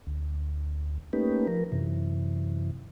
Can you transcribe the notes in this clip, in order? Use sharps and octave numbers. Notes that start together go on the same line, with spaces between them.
D2
A3 A#3 C#4 D#4 G4 B4
F3 A#4
F#2 C3 E3